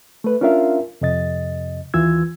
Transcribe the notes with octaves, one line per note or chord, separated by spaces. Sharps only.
A3 B4
C#4 D4 F4 A#4 E5 F5
F2 C3 D#5 A6
D#2 E3 F4 E6 G#6